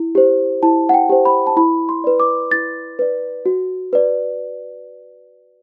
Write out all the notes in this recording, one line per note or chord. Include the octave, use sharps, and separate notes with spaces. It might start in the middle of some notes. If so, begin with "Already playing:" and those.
Already playing: E4
G4 C5
E4 A5
F#5
G5
G4 C5
B5
A5
E4 B5
C6
B4 D5
D6
E4 A6
B4 D5
F#4
B4 D5